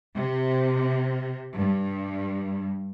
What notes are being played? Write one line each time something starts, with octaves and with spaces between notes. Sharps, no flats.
C3
G2